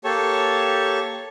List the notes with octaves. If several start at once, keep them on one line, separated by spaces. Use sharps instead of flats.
A#3 G4 A4 C#5 A5 C#6